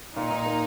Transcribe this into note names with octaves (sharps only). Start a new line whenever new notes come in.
A#2 D#4
A#2
A#3